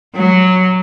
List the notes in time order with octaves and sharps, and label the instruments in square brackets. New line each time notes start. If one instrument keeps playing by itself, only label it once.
[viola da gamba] F#3